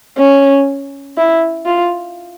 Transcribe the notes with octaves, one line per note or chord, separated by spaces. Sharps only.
C#4
E4
F4